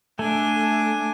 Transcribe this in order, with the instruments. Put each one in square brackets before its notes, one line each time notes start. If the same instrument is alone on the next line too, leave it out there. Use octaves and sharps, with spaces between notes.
[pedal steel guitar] A3 [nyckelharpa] D4 G#5